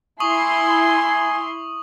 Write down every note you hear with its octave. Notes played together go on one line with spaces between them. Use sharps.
E4 G#5 C6 C#6 D#6 F#7